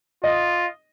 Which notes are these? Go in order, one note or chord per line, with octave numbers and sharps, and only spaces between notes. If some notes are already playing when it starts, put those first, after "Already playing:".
F4 D#5